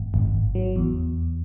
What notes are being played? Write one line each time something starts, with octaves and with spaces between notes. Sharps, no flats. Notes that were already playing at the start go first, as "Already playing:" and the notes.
Already playing: G#1
G#1
G#1
F#3
E2